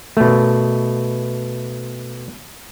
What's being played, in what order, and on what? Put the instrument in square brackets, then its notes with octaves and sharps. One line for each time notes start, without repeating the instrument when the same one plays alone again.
[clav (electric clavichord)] B2 A3